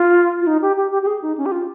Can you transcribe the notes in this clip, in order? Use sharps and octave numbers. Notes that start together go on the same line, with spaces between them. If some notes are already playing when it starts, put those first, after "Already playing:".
Already playing: F4
F4
D#4
G4
G4
G4
G4
G#4
D#4
C#4
G4
F4